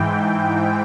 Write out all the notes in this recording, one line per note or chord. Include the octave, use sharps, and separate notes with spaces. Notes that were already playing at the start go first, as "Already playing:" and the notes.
Already playing: G#2 E3 G5